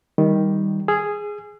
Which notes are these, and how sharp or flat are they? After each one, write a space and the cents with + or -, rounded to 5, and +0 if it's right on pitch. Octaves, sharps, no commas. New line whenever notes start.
D#3 +10 G3 +0
G#4 +0 E6 +45